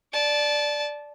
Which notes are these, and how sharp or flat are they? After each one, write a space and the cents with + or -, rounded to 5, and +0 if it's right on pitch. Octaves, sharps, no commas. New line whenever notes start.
D5 +0 A5 -20